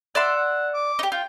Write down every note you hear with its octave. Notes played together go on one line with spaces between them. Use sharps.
D5 E5 F#5 C6
F#5
D6
D#4 G4
F4 G5